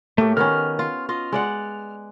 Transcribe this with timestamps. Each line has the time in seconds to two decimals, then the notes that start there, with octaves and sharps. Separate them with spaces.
0.18 A2 A3 A#3 G4
0.37 D#3 B3 C#4 F6
0.79 F4
1.09 F4 D#5
1.32 G#3 D5 F#5